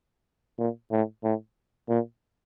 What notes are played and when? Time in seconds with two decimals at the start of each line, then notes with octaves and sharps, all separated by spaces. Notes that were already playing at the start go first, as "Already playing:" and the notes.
0.59 A#2
0.92 A2
1.24 A2
1.89 A#2